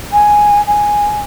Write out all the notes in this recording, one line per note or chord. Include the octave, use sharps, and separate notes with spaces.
G#5
G#5